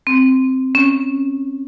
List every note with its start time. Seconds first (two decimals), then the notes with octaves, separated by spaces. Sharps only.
0.07 C4
0.75 C#4